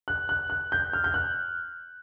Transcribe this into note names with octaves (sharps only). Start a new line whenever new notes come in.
F#6
F#6
F#6
G6
F6
G6
F#6